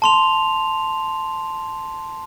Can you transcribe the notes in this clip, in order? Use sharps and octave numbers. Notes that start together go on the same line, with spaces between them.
A5 C6 F7